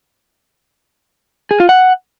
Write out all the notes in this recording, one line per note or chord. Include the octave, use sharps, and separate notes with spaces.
G#4
F4
F#5